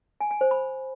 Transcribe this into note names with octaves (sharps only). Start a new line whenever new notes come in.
G#5
G#5
C5
B5